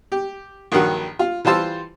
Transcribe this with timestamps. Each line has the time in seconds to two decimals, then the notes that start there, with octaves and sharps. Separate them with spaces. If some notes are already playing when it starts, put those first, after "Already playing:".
0.12 G4
0.72 A#1 G2 D#3 F#3 F#5
1.19 F4
1.45 E3 G3 F4 C5 A5 E6